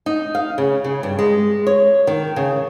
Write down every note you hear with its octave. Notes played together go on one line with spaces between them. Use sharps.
D#4
F5
C#3
C#3
G2
G#3
C#5
D#3
C#3